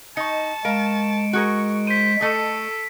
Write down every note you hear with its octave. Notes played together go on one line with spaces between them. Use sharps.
D#4 D#5 A5 C#6 C#7
G#3 A#4 F5 D7
F#4 G#4 A#4 C#6
C5 B6 D#7
A3 A4 D#5